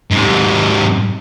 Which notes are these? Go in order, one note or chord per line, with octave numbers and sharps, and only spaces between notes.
G#2 C3